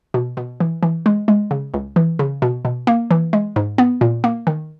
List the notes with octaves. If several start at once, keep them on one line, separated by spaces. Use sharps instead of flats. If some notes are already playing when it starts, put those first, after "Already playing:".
B2
B2
E3
E3
G#3
G#3
C#3
C#2
E3
C#3
B2
B2
A#3
E3
G#3
G#2
B3
A#2
A#3
D#3